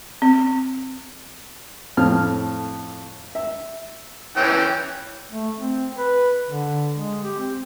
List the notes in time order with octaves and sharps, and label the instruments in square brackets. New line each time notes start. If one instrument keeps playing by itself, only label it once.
[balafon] C4
[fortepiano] F2 A2 F6
E5
[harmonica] E3 C#4 G5
[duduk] A3
C4
B4
D3
G#3
G4
C4